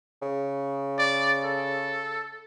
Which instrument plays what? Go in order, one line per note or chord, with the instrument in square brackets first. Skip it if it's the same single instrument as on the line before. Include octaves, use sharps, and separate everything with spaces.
[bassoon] C#3
[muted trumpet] D5
A4